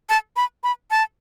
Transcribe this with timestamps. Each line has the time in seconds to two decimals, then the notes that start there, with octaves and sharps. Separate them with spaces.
0.09 A5
0.36 B5
0.64 B5
0.91 A5